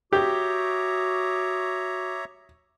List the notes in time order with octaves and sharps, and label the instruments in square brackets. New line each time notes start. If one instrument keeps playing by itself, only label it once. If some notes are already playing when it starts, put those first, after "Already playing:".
[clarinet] F#4 [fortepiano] G4 [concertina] C#5 E5 A#5 [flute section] D6 D#6